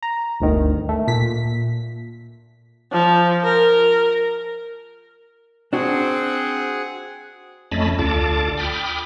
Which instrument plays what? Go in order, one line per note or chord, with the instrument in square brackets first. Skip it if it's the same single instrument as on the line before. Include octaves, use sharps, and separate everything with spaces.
[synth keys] A#5
G1 D2 D#3
A3
A#2 B6
[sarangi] F3
A#4
[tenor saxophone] C4 [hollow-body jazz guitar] D4 F#4 [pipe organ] G#4 F#5
[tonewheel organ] F2 A3 C#4 D#5 A5 B5
D2 F4 A4 D5 A5 D6
G5 B5 D6 D#6 F6